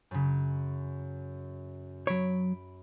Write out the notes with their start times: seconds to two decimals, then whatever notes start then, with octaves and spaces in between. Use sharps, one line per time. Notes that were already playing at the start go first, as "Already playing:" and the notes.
0.11 F#2 C#3
2.07 F#3 C#5 B5 D7